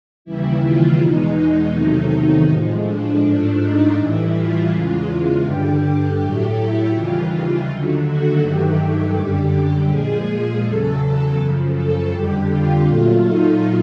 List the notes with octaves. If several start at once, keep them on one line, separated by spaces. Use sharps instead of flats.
D#2 C#3 E3 G3 E4
F4
E2 B2 G#3 D#4
E2 C3 D#3 F#3 A3 D#4
A2 F3 G#3
D4
G#2 F3 A3 D4
D#4
A2 E3 G3 E4
F4
E2 C#3 E3 G#3
G2 D3 G3 G4
G4
A2 F#3 A3
E4
D#2 C#3 E3 G3 F4
D#2 D3 F#3 A3
F#4
G2 D#3 F#3 A3 G4
F#2 D3 G3
A#2 F3 G#3 G#4
G#4
E2 C#3 F#3 A4
F#2 C#3 F3
A4
F2 D3 G3 G4
F4
A#2 F#3 A3 F4
D#4